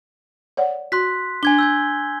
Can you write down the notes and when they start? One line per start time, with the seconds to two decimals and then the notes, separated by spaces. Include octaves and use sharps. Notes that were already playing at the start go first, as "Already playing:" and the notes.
0.57 C#5 D5 F#5
0.92 F#4 C6 F#6 B6
1.43 D4 G#5 G#6 G7
1.59 E6 G6 G#6